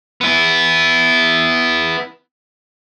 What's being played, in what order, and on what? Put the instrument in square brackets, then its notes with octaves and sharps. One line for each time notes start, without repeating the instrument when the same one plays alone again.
[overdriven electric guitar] B3 E4